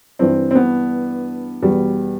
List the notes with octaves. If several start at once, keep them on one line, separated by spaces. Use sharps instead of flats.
G2 E3 C4
C4
B3
E2 B2 G3